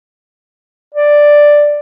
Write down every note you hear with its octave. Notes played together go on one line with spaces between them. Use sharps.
D5